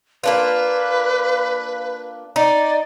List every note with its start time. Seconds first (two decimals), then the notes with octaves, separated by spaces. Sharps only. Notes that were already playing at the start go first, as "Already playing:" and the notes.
0.24 A#3 D4 F4 B4
2.36 D#4 D5